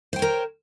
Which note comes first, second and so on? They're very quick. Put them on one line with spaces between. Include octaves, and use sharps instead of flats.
C5 G5 C#5 A#4